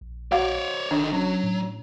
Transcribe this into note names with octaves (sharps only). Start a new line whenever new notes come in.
A#1
F#4 C#5 D5 F5 F#5
F#1 D3 D#3 D4
F#3 C#4
A2